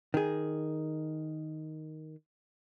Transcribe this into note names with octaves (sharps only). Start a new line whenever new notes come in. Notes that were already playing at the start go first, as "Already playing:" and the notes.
D#3 G#4